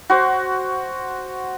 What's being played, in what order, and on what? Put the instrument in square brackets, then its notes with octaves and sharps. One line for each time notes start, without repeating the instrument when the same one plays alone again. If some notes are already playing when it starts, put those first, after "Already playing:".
[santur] F#4 C5